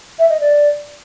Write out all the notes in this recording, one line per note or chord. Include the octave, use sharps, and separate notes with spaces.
E5
D#5
D5